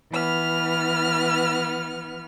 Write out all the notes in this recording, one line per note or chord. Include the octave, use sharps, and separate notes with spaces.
E3 B3 F6